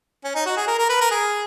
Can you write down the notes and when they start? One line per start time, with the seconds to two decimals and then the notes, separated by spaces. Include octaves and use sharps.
0.24 C#4
0.35 D#4
0.46 F#4
0.57 G#4
0.67 A#4
0.79 A#4
0.89 B4
1.01 A#4
1.11 G#4